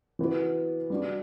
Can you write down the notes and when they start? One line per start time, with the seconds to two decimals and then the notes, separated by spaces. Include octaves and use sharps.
0.19 E3 B3 F#4
0.90 G3 D4 F#4